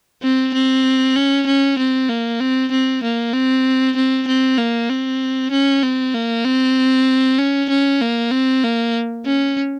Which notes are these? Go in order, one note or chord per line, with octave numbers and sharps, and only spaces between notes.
C4
C4
C#4
C#4
C4
A#3
C4
C4
A#3
C4
C4
C4
A#3
C4
C#4
C4
A#3
C4
C#4
C#4
A#3
C4
A#3
C#4